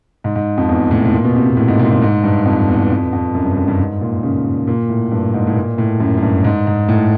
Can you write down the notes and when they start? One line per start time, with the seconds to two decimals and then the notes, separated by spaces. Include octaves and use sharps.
0.24 G#2
0.36 G#2
0.57 F2
0.69 E2
0.91 A2
1.05 A2
1.13 A#2
1.24 B2
1.35 C3
1.46 B2
1.57 A2
1.68 G#2
1.79 A#2
1.90 A#2
2.02 G#2
2.24 G2
2.46 F2
2.68 E2
2.90 F2
3.13 F2
3.35 F#2
3.45 G2
3.57 F#2
3.68 G2
3.79 G#2
4.01 A#2
4.23 C#3
4.67 A#2
4.89 A2
5.11 G2
5.34 G#2
5.47 A2
5.56 A#2
5.78 A2
6.00 F#2
6.17 F#2
6.22 G2
6.45 G#2
6.67 G#2
6.89 A2